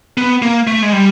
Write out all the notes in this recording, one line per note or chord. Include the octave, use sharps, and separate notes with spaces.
B3
A#3
A3
G#3
G3